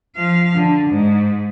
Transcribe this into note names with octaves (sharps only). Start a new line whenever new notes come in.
F3 F5
D3
G#2